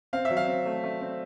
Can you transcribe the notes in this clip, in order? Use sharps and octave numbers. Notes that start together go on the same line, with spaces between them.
C4 F5
E5
F#3
F5
C4
A3
A3
C4